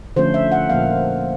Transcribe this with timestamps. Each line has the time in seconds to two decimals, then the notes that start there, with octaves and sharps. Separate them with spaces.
0.16 D3 F3 A3 C#4 C5
0.34 E5
0.52 F#5
0.69 A#2 F3 A#3 F5